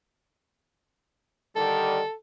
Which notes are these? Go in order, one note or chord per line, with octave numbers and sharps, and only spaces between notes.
D3 D#3 G3 A4